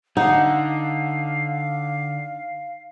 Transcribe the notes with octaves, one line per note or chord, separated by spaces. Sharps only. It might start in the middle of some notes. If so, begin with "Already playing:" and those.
D3 D#4 F5 F#5